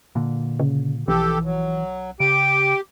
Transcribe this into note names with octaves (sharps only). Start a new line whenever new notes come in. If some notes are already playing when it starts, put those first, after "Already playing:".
A#2 D3 A#3
C#3
B1 E3 F3 G4 A4
F#3
C#3 G4 D7